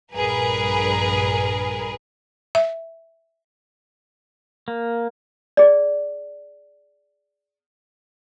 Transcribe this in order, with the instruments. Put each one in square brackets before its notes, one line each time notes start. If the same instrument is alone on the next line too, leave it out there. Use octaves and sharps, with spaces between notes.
[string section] A#1 G2 G#4 A#4 B4
[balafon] E5
[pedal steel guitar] A#3
[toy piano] G#4 D5